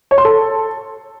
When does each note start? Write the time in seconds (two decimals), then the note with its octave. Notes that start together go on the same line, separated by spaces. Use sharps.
0.11 C#5
0.18 C6
0.25 A4